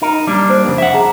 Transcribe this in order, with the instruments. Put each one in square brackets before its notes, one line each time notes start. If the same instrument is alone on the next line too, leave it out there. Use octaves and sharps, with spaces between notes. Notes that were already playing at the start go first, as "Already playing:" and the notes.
[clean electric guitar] D#4 A#4
G3 A#3 D4
[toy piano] C5
[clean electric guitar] F2 C#3
E5 F#5
[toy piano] G#4 A#5